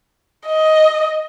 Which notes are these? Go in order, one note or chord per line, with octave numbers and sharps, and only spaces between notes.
D#5